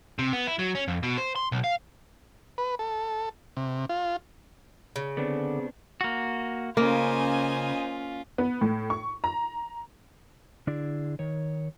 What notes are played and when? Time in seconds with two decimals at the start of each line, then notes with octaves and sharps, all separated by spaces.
0.19 C3
0.33 B3
0.47 E4
0.59 F#3
0.75 C#4
0.88 F2
1.03 B2
1.18 C5
1.36 C6
1.52 B1
1.64 F5
2.58 B4
2.79 A4
3.57 C3
3.89 F4
4.96 C#3
5.17 D3 B3 C4 D4
6.01 A#3 F#4
6.77 C#3 A#3 C#4 F4 C5 D#5 G#5
8.38 B3
8.61 A2
8.90 C#6
9.24 A#5
10.67 D3 D4 E4 G#4 D5
11.19 D#3 C#5